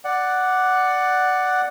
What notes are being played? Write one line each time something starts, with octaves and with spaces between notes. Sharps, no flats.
D5 F#5